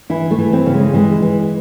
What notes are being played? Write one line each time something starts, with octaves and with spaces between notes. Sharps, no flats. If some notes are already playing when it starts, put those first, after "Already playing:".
E3 E4
A3
E3
C4
C#3
G#3
E3 G#3
E3